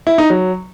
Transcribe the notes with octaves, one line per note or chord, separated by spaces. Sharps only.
E4
D#4
F#3